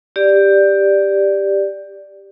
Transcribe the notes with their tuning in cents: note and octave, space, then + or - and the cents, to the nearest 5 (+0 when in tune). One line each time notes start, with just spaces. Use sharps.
G4 +10 D5 +0